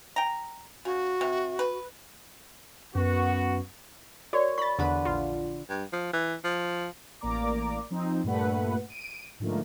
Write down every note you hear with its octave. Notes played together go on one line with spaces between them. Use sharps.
G5 A#5
C#3 F#4
C3
B4
F#2 B3 F#4
F#4 A#4 C#5 D5
B5 C#6 A6
E2 D3 B4 B5
A#1 F4
G2
F3
E3
F3
A1 A#3 D5 A#5 D6
F3 C4 D#4
G2 A#2 A3 B4 F#5
D7 D#7
G#2 D3 F3 A3 A#3